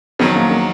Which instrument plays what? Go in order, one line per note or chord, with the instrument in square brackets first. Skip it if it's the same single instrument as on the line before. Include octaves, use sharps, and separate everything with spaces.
[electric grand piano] F2 D#3 F#3 [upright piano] B3
[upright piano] A#3
A#3